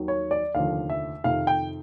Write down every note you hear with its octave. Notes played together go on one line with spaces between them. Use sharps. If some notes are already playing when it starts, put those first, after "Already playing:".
Already playing: D#2 D#3 F#3
C#5
D5
F1 D#2 D3 F3 F5
E5
F2 C3 D#3 F5
G5